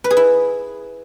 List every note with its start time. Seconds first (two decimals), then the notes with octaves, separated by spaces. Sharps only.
0.04 B4
0.10 G#4
0.17 E4